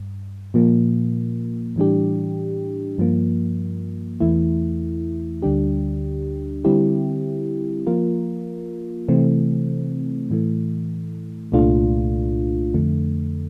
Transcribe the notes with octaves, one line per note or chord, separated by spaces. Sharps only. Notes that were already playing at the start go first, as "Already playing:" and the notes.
Already playing: G2
A#2 F3 A#3
A2 E3 G3 D4 G4
G2 F3 A#3
E2 E3 A3 E4
D2 D3 G3 D4 G4
D3 G3 C4 E4 G4
F3 A#3 F4 A#4
C3 E3 A3 C4
A2 E3 A3
C2 A#2 A3 D4 F4
F2 D3 A3